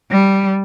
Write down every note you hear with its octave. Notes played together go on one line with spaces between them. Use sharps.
G3